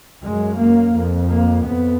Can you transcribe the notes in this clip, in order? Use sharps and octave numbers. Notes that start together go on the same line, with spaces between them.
F#2 G#3
A#3
F2
A#3
F2 B3